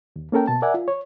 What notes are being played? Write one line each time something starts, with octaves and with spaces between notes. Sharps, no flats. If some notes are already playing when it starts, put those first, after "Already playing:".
D#2
A#3 C#4 A4 A#4 G5
B2 A5
A#4 D5 E5 F#5 G#5
F4
C#5